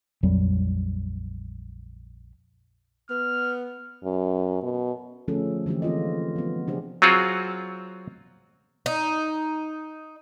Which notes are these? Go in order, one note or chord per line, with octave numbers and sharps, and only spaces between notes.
A#1 F2 F#3 G3
B3 F6
F#2
B2
D3 F3 A3 C#4 G#4 A4
D3 E3 G#3 A#3 G4
C4 F4 D#5
F3 B3
C3 D4 G4 G#4 C5
F#3 C4 F4 F#4 G#4
D#4